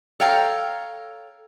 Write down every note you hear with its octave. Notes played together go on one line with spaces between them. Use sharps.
A4 C#5 F5 G5 A#5